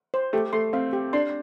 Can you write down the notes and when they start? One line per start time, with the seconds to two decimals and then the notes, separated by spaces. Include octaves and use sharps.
0.14 C5
0.33 A3 G4
0.53 A3 C6
0.73 C4 F5
0.93 G4
1.13 D4 C6